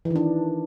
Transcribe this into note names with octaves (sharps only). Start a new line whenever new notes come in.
E3
D#3
D4